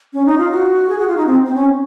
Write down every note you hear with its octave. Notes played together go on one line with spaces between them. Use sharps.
C#4
D#4
F4
F#4
G#4
F#4
F4
D#4
C4
C4
C#4